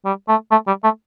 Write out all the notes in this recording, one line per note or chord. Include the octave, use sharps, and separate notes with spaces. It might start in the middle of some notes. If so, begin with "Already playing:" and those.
G3
A3
A3
G3
A3